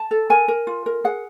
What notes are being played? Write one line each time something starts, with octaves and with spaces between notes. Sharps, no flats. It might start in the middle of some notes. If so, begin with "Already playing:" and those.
Already playing: A5
A4
A#4 G#5
A#4
F4
A#4
G#4 F#5